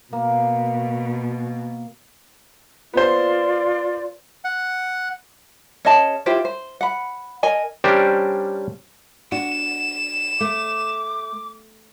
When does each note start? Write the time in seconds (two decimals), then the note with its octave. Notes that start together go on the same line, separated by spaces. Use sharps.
0.13 B2 A#3
2.94 B3 F4 C5 D5
4.45 F#5
5.85 C#4 G#4 D#5 A5
6.26 E4 F4 G4 C5
6.45 C5
6.81 F#5 B5
7.43 A#4 D#5 G#5
7.84 G3 C#4 D4 G4 A#4 C5
9.32 D4 F#4 E7
10.40 A3 D6